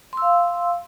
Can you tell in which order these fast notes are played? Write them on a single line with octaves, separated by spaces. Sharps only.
C6 E6 F5